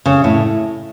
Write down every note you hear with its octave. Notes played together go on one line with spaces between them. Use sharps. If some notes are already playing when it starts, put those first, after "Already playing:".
C#3
A2